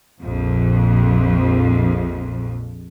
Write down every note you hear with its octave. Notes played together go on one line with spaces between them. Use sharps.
A#1 F2